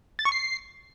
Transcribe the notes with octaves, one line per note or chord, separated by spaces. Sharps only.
A6
C#6
C7